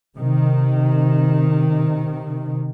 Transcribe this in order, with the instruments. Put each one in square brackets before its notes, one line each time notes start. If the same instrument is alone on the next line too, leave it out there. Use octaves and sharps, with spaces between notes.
[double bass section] C3 D#3